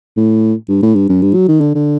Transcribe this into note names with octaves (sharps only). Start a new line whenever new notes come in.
A2
G2
A2
G2
F#2
G2
F#3
D#3
D3
D3